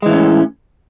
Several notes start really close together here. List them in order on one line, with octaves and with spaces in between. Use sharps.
G#3 E3 A2 C#4